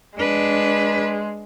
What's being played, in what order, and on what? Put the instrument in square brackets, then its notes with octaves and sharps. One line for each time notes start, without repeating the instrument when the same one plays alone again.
[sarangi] G#3 [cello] D4 B4